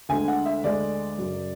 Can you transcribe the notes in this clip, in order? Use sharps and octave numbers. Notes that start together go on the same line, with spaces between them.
D2 D3 G#3 G#5
F#5
E5
D2 D3 G#3 D5
F#2 C#3 F#3